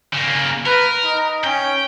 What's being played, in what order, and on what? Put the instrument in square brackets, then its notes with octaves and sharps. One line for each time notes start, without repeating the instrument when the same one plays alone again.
[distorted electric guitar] C#3 A#3
[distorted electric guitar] A#4 [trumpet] B4
[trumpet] D#4
[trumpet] C#4 [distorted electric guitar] G5